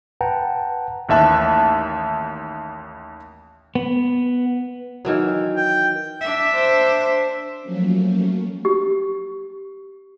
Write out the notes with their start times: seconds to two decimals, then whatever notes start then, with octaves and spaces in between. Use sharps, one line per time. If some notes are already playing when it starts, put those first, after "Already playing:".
0.21 B4 F#5 G5 A5 A#5
1.09 A1 D#2 E5 A5 F#6
3.75 B3
5.05 D#3 E3 F#3
5.56 G5
6.21 D4 E5
6.54 C5
7.61 F3 F#3 A3 A#3 C#4
8.65 G4